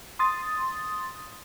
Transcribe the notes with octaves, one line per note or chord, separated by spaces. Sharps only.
C6 D#6 A6